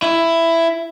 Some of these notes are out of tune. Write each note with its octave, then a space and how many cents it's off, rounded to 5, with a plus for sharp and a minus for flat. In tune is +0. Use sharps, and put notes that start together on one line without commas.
E4 +10